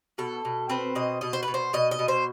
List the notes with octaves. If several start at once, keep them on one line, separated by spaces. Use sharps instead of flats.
B2 A4
B2
C4 B4
B2 D#5
B2 D#5
C5
B4
B2
C5
B2 D#5
D#5
B2
C5